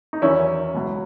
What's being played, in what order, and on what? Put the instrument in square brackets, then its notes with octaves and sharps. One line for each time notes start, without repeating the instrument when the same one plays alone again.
[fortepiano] D#4
E2 D#3 F#3 C#4 E4
C#2 B2 F#3